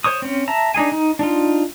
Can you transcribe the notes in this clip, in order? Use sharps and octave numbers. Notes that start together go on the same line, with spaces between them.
C5 C#5 C#6 D#6
C4 C#4
E5 A5 A#5
D4 D#4 G#4 G#5
D#4
D4 D#4 F4